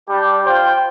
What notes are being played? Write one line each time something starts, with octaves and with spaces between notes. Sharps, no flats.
G3 D4 G4
F4 C5 G5